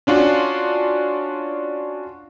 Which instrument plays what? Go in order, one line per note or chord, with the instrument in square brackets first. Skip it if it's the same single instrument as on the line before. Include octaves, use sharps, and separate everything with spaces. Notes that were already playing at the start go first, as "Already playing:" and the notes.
[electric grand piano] C#4 D4 F4 F#4